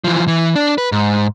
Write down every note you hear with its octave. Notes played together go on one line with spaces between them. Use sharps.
E3 F3
E3
D4
B4
G#2